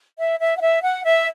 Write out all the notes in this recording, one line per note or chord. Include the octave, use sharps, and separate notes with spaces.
E5
E5
F#5
E5
F#5
E5